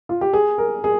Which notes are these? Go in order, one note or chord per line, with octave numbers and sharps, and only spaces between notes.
F4
G4
G#4
A#4
G#4